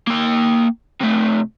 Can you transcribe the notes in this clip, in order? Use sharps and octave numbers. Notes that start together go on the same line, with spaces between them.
A#3 G5
C3 A3